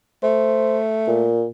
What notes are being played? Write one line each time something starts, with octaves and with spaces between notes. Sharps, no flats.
A3 C5
A#2